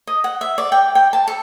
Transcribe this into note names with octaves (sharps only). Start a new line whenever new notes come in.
D#5
F#5
E5
D5
G5
G5
A5
A4